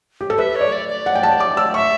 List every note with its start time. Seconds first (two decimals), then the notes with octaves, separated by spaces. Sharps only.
0.21 G4
0.30 A4
0.38 B4 E5
0.56 C#5
0.61 D5
0.72 D5
0.89 D5
1.06 F#5
1.15 G5
1.23 A5
1.40 D6
1.57 E6
1.74 E5 C#6